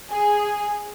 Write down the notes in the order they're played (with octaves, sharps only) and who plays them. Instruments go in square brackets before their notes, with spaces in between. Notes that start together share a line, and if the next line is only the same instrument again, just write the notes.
[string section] G#4